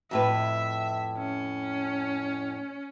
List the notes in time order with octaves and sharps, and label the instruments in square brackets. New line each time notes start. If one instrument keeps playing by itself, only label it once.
[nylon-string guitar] F2 A2 B4 [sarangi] E5
[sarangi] C#4